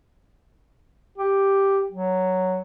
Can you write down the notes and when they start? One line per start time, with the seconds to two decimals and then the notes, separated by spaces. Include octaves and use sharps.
1.18 G4
1.92 F#3